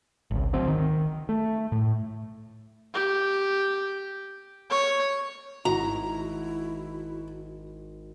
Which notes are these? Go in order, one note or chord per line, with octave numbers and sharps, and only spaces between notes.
G#1 C#2
D2 F#3 C4
D#3
A3
A2
G4
C#5
G#1 E4 F#4 A#5